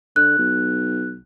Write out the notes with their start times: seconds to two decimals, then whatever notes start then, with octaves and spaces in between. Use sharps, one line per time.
0.16 D3 F#6
0.38 B1